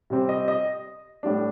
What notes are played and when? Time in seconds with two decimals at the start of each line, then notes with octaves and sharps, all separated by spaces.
0.10 C3 G3 C4
0.29 D#5
0.48 D#5
1.23 A2 G3 D4